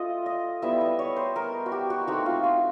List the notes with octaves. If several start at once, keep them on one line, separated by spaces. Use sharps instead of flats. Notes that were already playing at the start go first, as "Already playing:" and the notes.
Already playing: A3 F4 A4 D#5
D#5
G3 B3 E4 E5
D#5
C#5
C5
A#4
F#4
G4
F#4
A3 C4 D#4 F#4
F4
F#4